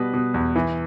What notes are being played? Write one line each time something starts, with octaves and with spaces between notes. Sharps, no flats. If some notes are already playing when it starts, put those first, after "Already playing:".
Already playing: B2 G3 B4
B2
E2
E3